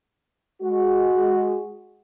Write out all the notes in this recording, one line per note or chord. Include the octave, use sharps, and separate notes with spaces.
G#3 F#4